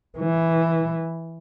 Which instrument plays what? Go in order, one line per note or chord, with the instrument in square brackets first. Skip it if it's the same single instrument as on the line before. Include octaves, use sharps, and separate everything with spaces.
[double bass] E3